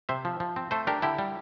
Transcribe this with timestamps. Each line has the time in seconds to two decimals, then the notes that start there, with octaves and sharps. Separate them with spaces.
0.09 C3 C5 E5
0.25 F3
0.40 F3
0.56 C4
0.71 A3 A4 C5
0.87 D4 G4 A#4
1.02 D3 E4 G4
1.19 G3